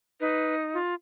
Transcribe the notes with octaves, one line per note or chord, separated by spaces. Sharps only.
D#4 B4
F4